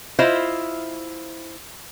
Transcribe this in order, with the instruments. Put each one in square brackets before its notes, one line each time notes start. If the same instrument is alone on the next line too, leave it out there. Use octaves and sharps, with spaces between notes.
[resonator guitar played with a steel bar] E4 F4 C5 D#5 E5